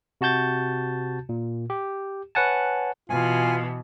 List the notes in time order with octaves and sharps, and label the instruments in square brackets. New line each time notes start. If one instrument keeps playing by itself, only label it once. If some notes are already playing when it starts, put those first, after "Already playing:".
[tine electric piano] C3 F#4 A5 G6 A6
A#2
G4
B4 C#5 F#5 G#5 A5
[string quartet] B2 E3 [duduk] F4 [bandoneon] G#5